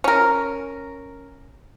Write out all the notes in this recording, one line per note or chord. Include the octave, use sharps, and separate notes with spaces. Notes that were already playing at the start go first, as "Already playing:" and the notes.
C#4 A#4